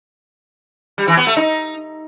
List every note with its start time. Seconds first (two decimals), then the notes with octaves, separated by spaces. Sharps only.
0.98 G3
1.08 E3
1.17 B3
1.27 A3
1.37 D#4